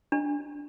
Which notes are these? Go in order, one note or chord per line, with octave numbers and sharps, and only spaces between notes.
D4